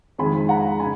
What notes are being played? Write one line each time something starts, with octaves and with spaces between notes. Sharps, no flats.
F2 D#3 G#3 G#5 B5
F#5 A#5
C#3 G#5 B5